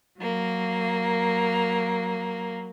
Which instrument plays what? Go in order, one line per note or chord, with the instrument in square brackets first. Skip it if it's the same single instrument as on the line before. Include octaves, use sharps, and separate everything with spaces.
[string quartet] F#3 A#3